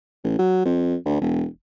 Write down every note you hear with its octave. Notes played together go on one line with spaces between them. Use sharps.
A1
F#3
F2
D2
E1